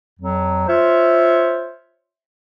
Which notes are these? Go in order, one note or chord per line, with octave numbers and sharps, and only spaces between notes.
F2 F#3
F4 C5 C#5 E5